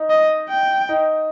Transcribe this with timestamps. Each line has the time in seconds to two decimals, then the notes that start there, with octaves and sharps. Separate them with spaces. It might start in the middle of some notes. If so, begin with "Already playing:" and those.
Already playing: D#4
0.10 D#5
0.49 G5
0.89 D#4